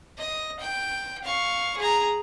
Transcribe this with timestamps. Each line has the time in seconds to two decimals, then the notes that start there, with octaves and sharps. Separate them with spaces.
0.18 D#5
0.60 G5
1.24 F5 C#6
1.78 G#4 A#5